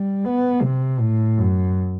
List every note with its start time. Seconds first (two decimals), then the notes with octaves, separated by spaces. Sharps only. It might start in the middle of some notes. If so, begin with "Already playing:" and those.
Already playing: G3
0.25 B3
0.62 C3
1.00 A2
1.38 F#2